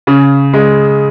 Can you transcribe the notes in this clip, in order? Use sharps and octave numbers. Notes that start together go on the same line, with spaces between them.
C#3
G#3